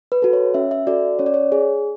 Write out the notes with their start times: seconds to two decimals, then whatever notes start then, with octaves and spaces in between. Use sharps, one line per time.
0.12 B4
0.22 F#4 A4
0.33 C#5
0.54 C#4 E5
0.71 E5
0.87 F#4 A4 D5
1.19 C#4 C#5
1.26 D5
1.34 C#5
1.52 G#4